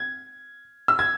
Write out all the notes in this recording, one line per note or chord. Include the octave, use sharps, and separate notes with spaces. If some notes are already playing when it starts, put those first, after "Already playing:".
Already playing: G#6
E6
G#6